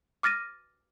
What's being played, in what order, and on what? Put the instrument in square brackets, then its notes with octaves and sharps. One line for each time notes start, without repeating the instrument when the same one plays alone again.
[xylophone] D6 F6 A6 A#6 D#7